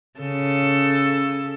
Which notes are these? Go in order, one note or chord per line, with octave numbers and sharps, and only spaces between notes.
C#3 A4